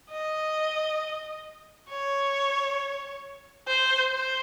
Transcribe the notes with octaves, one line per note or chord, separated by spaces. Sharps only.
D#5
C#5
C5
C5